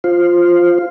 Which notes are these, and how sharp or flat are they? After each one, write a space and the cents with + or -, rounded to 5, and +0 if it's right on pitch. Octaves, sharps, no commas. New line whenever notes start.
F4 +0 C5 +0